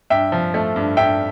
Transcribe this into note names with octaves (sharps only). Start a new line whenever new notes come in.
G2 E5 G5
F3
A3
G2
G2 E5 G5